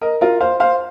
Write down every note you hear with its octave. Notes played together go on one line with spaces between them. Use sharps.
A#4 D#5
F4 A#4
C5 F5
C5 F5